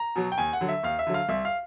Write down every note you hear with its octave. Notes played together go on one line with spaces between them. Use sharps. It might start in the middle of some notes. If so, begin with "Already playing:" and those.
Already playing: A#5
B2 F#3
G5
D#2 G#5
F#5
D3 F#3
E5
D#2 F5
E5
D3 F#3
F5
C2 E5
F5